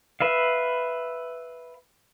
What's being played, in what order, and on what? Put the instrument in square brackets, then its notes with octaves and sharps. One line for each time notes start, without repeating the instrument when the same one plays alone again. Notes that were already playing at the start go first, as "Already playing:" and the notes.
[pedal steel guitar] B4 E5 F5